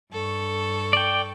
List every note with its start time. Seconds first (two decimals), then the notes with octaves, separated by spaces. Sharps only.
0.13 G2 A4 C#6
0.93 D5 G5